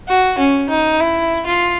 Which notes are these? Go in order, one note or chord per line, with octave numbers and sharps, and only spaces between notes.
F#4
C#4
D#4
E4
F4